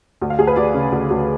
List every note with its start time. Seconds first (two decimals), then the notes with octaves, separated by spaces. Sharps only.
0.21 D2
0.30 F5
0.39 D2 G#4
0.47 B4
0.56 D2 D5
0.74 C#3
0.92 D2
1.10 D2